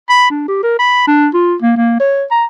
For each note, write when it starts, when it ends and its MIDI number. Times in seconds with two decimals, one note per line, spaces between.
0.10 0.30 83
0.30 0.47 62
0.48 0.61 67
0.63 0.77 70
0.79 1.07 83
1.08 1.28 62
1.34 1.56 65
1.62 1.74 58
1.77 1.95 58
2.00 2.24 73
2.31 2.45 82